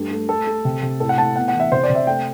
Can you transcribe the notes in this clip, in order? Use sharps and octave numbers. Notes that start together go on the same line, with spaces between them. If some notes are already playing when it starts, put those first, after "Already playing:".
Already playing: G2 A3 G4
A3
A3 A4
A3
C3
C3
A2 A4
F#5
A2 A5
B3 F#5
F#5
E3
E5
C3 C5
D5
C3
E5
A3 G5